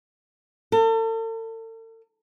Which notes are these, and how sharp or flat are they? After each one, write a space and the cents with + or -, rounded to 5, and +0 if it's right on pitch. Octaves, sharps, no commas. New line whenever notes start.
A4 +40